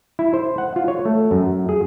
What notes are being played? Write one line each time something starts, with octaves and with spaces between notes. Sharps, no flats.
E4
C5
F#5
F4
C#5
A3
F#2
G#4